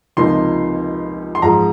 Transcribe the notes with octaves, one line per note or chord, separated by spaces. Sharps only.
C#2 C3 F3 A#3 D#4 C6
C6
G#2 F3 G#3 A#5